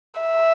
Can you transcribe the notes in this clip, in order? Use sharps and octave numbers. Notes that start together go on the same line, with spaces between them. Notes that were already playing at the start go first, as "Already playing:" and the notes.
E5